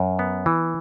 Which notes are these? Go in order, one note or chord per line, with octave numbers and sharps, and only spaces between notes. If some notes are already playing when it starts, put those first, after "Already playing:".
Already playing: F#2
B3
E3